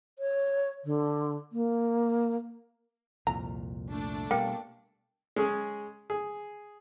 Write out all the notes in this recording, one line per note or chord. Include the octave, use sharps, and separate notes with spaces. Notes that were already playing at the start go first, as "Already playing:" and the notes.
C#5
D3
A#3
C2 F2 A#2 A#5
A3 D4
B2 G3 A#3 G5
G#3 C#4 G#4
G#4